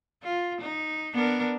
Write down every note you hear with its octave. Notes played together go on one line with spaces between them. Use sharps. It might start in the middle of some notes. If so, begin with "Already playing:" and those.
F4
D#4
B3 D4 A#4